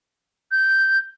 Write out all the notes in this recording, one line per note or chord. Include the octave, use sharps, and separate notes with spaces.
G6